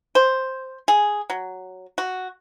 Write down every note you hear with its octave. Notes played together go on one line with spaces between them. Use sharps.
C5
G#4
F#3
F#4